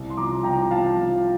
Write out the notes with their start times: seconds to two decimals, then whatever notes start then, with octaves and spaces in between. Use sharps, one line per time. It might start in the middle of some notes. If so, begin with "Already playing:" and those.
Already playing: C2
0.10 C6
0.17 F3 A#5 D6
0.43 C2 G5 A#5
0.71 F3 F5 A5
0.97 F3